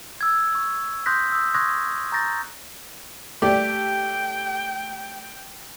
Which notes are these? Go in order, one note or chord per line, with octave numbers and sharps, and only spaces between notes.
E6 G#6
C#6
C6 D#6 F#6 G6 A#6 B6
D#6 E6
C6 C#6 D#6 F#6 G#6 A#6
A#5 C#6 G6 A6 A#6
A3 G4 D5 G5